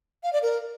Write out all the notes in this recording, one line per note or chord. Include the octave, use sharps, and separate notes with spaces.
F5
D5
A#4